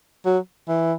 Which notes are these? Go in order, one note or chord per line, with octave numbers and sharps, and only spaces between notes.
F#3
E3